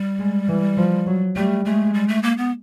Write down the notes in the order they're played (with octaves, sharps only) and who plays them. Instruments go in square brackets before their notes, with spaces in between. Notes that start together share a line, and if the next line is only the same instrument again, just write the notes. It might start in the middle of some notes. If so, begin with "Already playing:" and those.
Already playing: [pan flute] G3
[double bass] G#3
E3
F3
F#3
[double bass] G3 [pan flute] A3
[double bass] G#3 [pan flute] A3
[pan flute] G3
A3
A#3
B3